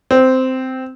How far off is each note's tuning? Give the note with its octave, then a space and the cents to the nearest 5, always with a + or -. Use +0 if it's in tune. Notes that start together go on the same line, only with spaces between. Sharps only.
C4 -10